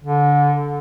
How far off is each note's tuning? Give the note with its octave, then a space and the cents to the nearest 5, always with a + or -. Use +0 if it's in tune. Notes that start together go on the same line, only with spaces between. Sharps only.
D3 -20